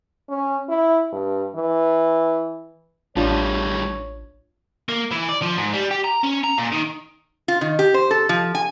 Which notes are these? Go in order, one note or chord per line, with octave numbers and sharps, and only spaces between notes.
C#4
E4
G2
E3
A1 A2 G3 D4 F4 C#5 A5
A#3
E3
D5
F3
G#2
G3
G4
A#5
C#4
A#5
A#2
D#3
F4
D#3
G4
C5
A4
F3
G#5